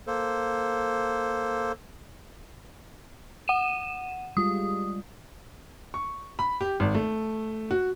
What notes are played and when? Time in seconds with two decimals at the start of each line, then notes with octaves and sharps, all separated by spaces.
0.07 A#3 A4 C5
3.48 F#5 D#7 E7
4.37 G3 G#3 F4 D#6
5.94 C#6
6.39 B5
6.61 G4
6.80 G#1
6.95 A3
7.71 F#4